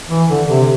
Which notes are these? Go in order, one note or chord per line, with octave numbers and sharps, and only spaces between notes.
E3
D3
C3